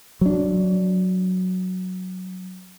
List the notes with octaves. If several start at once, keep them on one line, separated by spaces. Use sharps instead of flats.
F#3 D4